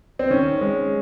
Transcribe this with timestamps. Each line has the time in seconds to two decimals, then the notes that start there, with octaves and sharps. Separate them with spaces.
0.19 C4
0.30 D#3 C#4
0.61 G#3